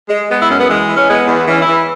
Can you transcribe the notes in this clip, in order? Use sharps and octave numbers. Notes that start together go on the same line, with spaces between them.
G#3
G#3 B3
E4
F#2 C#4
B3
E3 G#3
E3
C#4
G#3 B3
E2
B3
E3 C#4
E4
E3